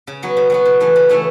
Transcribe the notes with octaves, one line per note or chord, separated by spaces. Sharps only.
C#3
F#3 B3 F#4
C#3
F#3 B3 F#4
C#3
E3 A3 C#4
C#3
E3 A3 C#4